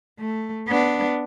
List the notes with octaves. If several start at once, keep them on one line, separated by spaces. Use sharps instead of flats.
A3
B3 D4